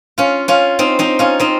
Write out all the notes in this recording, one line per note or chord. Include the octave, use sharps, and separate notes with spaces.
C#4 F4
C#4 F4
C4 D#4
C4 D#4
C#4 F4
C4 D#4